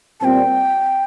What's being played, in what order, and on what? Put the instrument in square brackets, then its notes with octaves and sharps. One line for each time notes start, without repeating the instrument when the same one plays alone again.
[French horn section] A#2 G3 C4 [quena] G5 A5